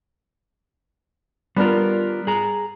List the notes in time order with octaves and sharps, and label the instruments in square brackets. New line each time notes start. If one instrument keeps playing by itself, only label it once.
[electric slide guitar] G3 F4 [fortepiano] B3 D4 A#4
[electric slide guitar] G#4 A#5